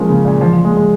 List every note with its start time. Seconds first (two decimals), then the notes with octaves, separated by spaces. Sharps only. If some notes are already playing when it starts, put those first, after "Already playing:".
Already playing: F3 G#3 A#3 C#4
0.09 C#3
0.25 A#2
0.41 F3
0.53 F3
0.65 G#3
0.77 G#3